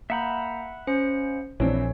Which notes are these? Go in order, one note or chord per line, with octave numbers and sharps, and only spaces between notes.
A#3 E5 F#5 A#5 B5 G6
C#4 C5 C#7
A#1 E3 C4 D4 C#5